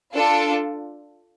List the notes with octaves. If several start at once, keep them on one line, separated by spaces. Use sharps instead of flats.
D4 F4 A4